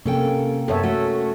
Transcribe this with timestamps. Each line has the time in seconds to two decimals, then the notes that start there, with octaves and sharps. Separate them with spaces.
0.06 C3 A#3 C#4 A4 G5
0.68 F#2 B3 A4 C#5 E5
0.83 A3 C#4 F#4